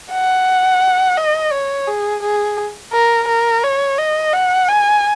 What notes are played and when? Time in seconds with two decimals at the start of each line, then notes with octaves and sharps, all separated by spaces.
0.12 F#5
1.18 D#5
1.52 C#5
1.87 G#4
2.23 G#4
2.93 A#4
3.28 A#4
3.63 C#5
3.98 D#5
4.33 F#5
4.69 G#5